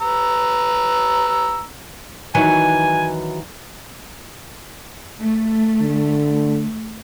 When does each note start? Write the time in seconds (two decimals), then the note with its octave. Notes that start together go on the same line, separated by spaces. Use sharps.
0.01 B4 A#5 E6
2.35 D#3 E3 F#3 G#5
5.20 A3
5.81 D3